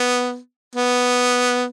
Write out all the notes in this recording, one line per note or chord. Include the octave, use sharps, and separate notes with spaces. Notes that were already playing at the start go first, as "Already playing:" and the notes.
Already playing: B3
B3